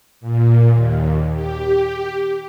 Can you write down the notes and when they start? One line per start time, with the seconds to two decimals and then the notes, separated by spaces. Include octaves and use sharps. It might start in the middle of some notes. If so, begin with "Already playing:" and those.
0.21 A#2
0.72 D#2
1.34 G4